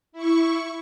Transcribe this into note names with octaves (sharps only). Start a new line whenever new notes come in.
E4 C#6